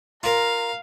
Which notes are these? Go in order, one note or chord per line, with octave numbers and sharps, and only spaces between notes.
F4 A#4 F5 A#5